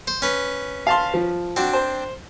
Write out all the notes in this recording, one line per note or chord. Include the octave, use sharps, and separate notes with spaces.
C5
C#4 B4
F5 A5 C6
F3
C4 D4 F#4
C5